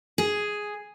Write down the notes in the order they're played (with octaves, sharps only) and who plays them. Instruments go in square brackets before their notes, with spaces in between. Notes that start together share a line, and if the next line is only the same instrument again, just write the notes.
[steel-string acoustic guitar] G#4